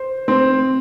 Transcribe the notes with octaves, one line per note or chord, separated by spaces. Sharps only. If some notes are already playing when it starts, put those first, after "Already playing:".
Already playing: C5
C4